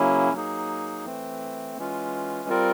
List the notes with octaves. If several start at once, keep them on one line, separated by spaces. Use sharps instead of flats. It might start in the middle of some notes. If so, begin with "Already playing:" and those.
Already playing: C#3 F#3 A#3 C#4 E4
F#3 A#3 D#4 G#4
E3 A3 C4
E3 G#3 C#4 F4
G3 C4 F4 A#4